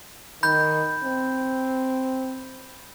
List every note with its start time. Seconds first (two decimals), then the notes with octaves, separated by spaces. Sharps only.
0.43 D#3 B5 G6
1.04 C4